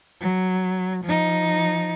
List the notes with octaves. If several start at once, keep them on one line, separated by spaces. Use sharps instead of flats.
F#3
F3 D#4